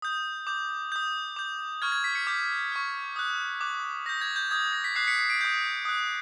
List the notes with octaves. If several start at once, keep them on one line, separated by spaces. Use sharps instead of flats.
D#6 G6
D6 G6
D#6 G6
D6 G6
C#6 F6 G#6
G#6
B6
B6 C#7
D6 G6 B6
C#6 F6
D#6 F#6
D6 F#6
D#6 G6 A#6
G#6
G6
D#6 G6 G#6
A#6
B6
D6 F#6 C7
B6 C#7
C7
C7 D7
D#6 G6
D#6 F#6